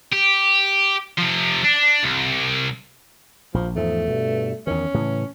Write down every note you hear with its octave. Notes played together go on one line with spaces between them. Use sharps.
G4
C3 F3
D4
C2
A#1 F3
E2 G#2 F3 A3
G2 B2
E2 D#3 C#4
A2 C#3 E3